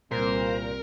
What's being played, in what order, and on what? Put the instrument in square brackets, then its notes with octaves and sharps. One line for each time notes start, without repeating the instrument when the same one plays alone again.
[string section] C2 [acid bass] A#2 [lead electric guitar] A#4 [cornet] C5